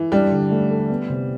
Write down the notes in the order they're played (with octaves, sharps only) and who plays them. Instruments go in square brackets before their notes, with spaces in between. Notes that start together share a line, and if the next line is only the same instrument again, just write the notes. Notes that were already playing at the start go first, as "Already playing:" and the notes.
Already playing: [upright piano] E3
[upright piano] G3 [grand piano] D4
[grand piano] D3
A3
A4
B3
C3